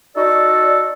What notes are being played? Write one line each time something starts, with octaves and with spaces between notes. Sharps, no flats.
D#4 F#4 A4 D5